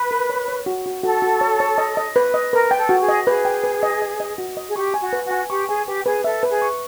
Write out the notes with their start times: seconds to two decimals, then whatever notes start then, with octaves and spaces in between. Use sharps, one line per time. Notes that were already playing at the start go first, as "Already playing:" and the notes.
Already playing: B4
0.11 A#4
0.30 C#5
0.48 C#5
0.66 F#4
0.86 F#4
1.04 F#4 A4
1.22 F#4
1.41 C#5
1.60 C#5
1.78 D#5
1.97 D#5
2.16 B4
2.34 D#5
2.52 A#4 B4
2.71 G5
2.78 A4
2.89 F#4
3.02 G#4
3.08 D#5
3.27 G#4 B4
3.45 G5
3.64 B4
3.83 D#5
4.02 D#5
4.20 D#5
4.38 F#4
4.57 D#5
4.69 G#4
4.76 G4 C#6
4.94 G#5
5.01 F#4
5.13 B4
5.25 F#4
5.31 G#5
5.50 G4 C#6
5.68 G#4 G#5
5.87 G4 B4
6.06 G#4 B4
6.24 A4 E5
6.43 B4
6.49 G#4
6.62 C#6